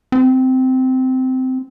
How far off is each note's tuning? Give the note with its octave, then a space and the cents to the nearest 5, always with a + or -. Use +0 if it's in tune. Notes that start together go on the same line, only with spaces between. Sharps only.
C4 -15